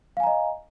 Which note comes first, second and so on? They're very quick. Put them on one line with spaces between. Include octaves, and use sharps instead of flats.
F5 G#5 A#5 D#5